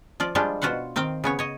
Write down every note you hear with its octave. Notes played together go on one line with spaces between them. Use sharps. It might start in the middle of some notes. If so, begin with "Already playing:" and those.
F3 F4 D5
F3 G3 G#3 D4 F4 G4
B2 F4 F#4 C5 F#5
D#3 C4 F5 G5
C#3 B3 C#5
C#5 D#5